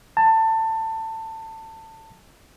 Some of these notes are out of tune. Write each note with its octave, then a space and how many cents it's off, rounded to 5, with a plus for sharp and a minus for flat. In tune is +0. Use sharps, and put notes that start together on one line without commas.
A5 +20